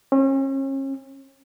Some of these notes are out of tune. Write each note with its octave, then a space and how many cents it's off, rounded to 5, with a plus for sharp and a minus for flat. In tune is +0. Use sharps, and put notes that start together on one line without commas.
C#4 -40